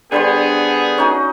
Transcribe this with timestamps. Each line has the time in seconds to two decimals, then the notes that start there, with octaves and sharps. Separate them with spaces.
0.12 D3 G3 B3 G#4 C5
0.98 C#4 D#4 F#4